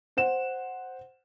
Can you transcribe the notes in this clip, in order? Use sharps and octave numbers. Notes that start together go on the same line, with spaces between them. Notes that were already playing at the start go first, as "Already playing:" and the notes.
C5 F#5 E7